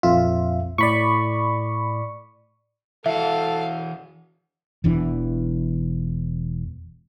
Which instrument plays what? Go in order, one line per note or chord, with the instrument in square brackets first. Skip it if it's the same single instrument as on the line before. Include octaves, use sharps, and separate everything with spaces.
[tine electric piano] A#1 F2 E5 [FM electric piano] F4
[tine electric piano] A2 [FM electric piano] D5 B5 C#6
[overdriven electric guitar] E3 F#4 [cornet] A4 [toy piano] E5 [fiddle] F5
[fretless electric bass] E1 E2 E3 D4